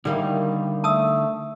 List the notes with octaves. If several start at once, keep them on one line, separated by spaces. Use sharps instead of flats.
D3 D#3 G3 A#3 D#4 E4 F5
A3 A5 D#6 E6